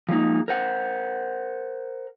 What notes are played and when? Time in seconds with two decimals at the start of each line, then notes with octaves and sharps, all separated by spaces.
0.09 F3 G#3 A#3 D#4
0.48 A#4 C5 F#5